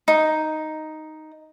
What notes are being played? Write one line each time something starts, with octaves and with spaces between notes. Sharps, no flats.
D#4